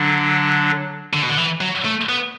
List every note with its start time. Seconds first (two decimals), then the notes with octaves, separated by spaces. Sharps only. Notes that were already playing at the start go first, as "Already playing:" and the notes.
Already playing: D3 F#3 D4
1.13 D3
1.23 B2
1.29 D3
1.38 E3
1.61 F#3
1.85 A3
2.09 B3